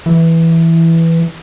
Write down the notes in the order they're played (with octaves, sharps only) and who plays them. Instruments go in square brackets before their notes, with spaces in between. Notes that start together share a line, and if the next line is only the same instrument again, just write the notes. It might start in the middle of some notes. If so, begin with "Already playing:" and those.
[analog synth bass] E3